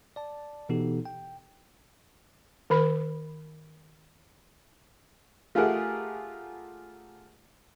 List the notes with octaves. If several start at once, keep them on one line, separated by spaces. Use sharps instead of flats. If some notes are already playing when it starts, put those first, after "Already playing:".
D5 A5
B2 E3 B3 D#4 G4 A4
G5
D#3 A#4 B5
A3 F4 G4 G#4 A#4 F#5